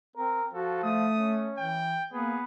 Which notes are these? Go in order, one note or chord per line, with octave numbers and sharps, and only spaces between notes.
C4 A#4
F3 F#4 A4
A3 D#6
C#4
E3 G5
A#3 B3 G#4